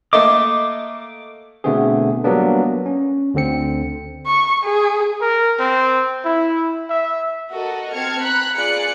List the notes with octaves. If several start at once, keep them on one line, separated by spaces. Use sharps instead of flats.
A3 A#3 D#5 D6
B2 D3 A3 B3 C4 G#4
F#3 G3 A#3 B3 D4
C#4
D2 D3 C4 C#7
C#6
G#4
A#4
C4
E4
E5
F#4 A4 A#4 D#5
C4 A5 F6 G#6 C#7
A#5 B5 F#6
F4 G#4 D5 F#6 C#7